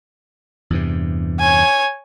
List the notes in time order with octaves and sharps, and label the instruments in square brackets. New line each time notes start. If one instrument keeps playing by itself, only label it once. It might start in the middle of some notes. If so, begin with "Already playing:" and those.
[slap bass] E2 G2 C3
[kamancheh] C#5 G#5